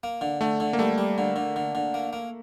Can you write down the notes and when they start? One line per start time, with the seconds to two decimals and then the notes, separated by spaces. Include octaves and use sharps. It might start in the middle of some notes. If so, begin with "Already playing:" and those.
0.03 A#3
0.21 D3
0.41 D3 A3
0.60 D3
0.73 A#3
0.79 G3 A3
0.98 G3
1.18 D3
1.36 D3
1.56 D3
1.75 D3
1.94 A#3
2.13 A#3